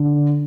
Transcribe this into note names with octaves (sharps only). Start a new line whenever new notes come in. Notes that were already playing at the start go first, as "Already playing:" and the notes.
Already playing: D3